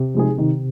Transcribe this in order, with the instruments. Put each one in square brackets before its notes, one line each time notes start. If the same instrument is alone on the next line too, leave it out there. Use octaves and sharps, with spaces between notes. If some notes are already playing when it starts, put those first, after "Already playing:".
Already playing: [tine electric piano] C3
[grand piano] F3 G#3 D#4 G#4
D#3